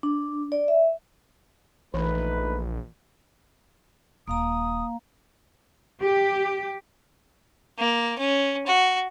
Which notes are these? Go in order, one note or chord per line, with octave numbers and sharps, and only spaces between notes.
D4
D5
E5
A#1 E3 A3 D#4 B4
D#1 A#3 F5 A#5 D#6
G4
A#3
C#4
F#4